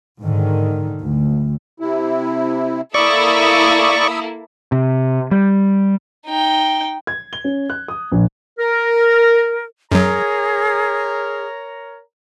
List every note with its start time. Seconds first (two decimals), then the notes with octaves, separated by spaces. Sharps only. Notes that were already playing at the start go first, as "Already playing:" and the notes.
0.22 G#2 D3 D#3
1.03 D2
1.80 C3 E4
2.94 A#3 E4 A4 D5 B5 C#6 D#6 E6
4.72 C3
5.31 G3
6.26 D#4 G5
7.07 G#6
7.33 G7
7.44 C#4
7.70 F#6
7.88 D#6
8.11 A#1
8.58 A#4
9.92 F#2 F#3 G#4 A#4 C#5 A#5